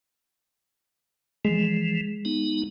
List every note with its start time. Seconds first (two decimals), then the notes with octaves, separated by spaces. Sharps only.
1.45 E3 F3 G#3
2.25 B3 D#4